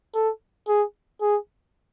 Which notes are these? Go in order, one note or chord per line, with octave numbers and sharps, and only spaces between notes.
A4
G#4
G#4